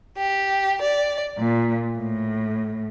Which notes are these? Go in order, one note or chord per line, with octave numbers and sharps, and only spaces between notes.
G4
D5
A#2
A2